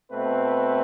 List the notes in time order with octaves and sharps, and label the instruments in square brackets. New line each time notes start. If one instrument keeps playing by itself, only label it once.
[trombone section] B2 A3 C4 B4